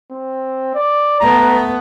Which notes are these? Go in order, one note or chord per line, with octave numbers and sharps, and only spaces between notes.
C4
D5
A3 B3 A#5